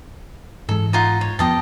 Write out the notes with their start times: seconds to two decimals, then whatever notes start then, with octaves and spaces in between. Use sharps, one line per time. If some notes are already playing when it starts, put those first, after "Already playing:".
0.69 G#2 E3 G#3 A4
0.93 D#4 F4 F#5
1.21 C#5
1.39 F2 F3 B3 G4 D#5 A5